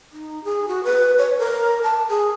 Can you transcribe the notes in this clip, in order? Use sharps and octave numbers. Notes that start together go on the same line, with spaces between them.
D#4
G#4
F#4
B4
C#5
A#4
A5
G#4